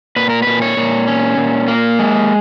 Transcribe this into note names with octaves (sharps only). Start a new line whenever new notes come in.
A#2 B4
A#4
A#2 B4
C#5
A#2
C#4
A#2
A#3
G#3